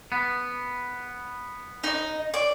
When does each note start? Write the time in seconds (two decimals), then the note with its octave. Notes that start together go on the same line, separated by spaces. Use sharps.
0.12 B3
1.84 D#4 D#5
2.34 D5